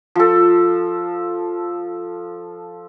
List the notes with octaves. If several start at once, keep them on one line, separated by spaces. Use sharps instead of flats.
F3 A4